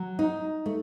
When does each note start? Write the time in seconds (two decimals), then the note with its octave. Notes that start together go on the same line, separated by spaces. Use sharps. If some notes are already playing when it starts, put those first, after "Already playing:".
Already playing: F#3
0.19 D#4
0.66 A3